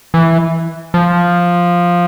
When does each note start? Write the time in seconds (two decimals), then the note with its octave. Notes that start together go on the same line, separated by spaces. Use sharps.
0.14 E3
0.94 F3